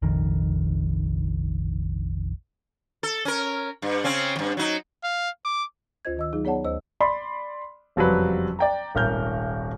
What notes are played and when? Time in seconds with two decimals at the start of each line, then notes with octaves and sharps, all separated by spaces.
0.02 F1 A#1 F2 D#3
3.03 A4
3.25 C#4 A#4
3.82 G2
4.04 C#3 C4 C#4
4.36 E2 G2
4.57 F#3 D#4
5.04 F5
5.45 D6
6.05 D2 F4 C5 D#5 G#6
6.17 D#3 D#5 E6
6.33 F#3 D#4 G#4
6.45 B3 G#4 C#5 D5 F#5 A5
6.64 D2 C5 D#5 E6
7.00 D5 B5 C6
7.96 F#1 F2 F#3 G3 B4
8.59 D5 G5 A#5
8.95 D#1 G#1 A#4 F6 G6